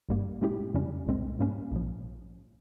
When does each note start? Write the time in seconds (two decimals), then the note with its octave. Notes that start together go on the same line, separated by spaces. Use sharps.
0.09 G#1 G2 G3 A#3
0.41 A#2 G#3 C#4 E4 G4
0.74 F2 C#3 G3 C#4
1.06 C2 A#2 G#3 C4
1.39 G#2 G3 A#3 C#4
1.72 A#1 A#2 F3